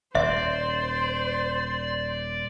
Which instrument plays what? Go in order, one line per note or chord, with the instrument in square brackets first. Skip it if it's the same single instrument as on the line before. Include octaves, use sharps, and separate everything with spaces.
[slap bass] D#1 [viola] C5 [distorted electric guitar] D5 [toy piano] E5